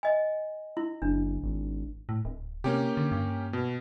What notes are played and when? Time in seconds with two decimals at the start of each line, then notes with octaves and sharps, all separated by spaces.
0.03 D#5 G#5
0.77 E4
1.02 F#1 D4
1.43 G#1
2.09 A2
2.25 D1
2.64 C3 A#3 C#4 G4
2.97 D3
3.12 G2
3.53 B2